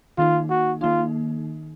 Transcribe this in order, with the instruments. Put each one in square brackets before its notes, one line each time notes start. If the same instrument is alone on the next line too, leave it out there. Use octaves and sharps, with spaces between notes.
[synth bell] D#3 A#3 D#4 [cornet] F4
[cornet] F#4
[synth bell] D#3 A#3 D#4 [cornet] F4